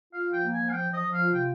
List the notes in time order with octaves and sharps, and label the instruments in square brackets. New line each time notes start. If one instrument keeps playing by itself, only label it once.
[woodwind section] F4 [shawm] F5
[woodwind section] F3 [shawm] G5
[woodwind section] A#3
[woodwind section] F3 [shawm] G#5
[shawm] F5
[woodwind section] F3 [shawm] G5
[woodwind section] F3 [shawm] D#5
[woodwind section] F3
[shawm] F5
[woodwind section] F4
[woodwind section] C3 [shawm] G5